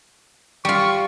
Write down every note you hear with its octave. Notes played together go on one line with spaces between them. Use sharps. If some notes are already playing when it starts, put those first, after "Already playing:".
G3 F4 C#6